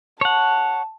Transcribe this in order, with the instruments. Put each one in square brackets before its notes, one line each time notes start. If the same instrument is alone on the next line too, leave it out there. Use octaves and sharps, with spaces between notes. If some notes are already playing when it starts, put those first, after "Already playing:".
[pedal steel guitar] C#5 F#5 [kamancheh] A5